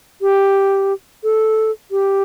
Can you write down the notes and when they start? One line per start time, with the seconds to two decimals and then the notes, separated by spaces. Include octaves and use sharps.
0.21 G4
1.23 A4
1.91 G4